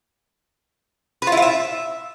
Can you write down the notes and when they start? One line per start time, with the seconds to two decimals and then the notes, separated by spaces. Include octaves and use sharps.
1.22 B4
1.27 F4
1.32 E4
1.37 F4
1.42 E5